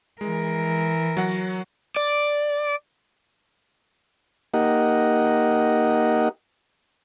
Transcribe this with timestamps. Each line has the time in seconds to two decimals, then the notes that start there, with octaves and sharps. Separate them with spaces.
0.21 E3 G#3 A#4
1.17 F#3 F#5 A#6
1.96 D5
4.54 A#3 D#4 G4 A#4 D#5 F#5